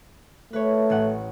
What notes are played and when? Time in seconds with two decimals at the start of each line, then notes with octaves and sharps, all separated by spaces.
0.53 A3 B4 C#5
0.90 A1 C#4 F#5